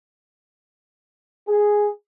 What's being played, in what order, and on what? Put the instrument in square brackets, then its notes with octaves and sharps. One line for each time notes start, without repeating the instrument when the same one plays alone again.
[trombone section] G#4